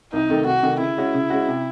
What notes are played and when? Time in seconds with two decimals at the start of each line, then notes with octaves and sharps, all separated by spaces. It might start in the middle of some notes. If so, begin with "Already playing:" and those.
0.12 C2 D#4
0.30 C3 D#3 A3
0.46 C2 F#4
0.63 C3 D#3 A3
0.79 C#3 E4
0.97 G#3 C#4 F#4
1.14 C#3
1.30 G#3 C#4 F#4
1.48 C3